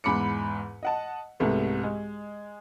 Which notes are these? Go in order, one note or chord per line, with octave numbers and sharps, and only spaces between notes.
E2 G#2 B5 D6 C#7
D#5 F#5 A5
C2 G#2 A3 B3
G#3